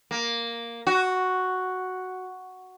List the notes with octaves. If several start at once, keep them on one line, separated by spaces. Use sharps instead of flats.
A#3
F#4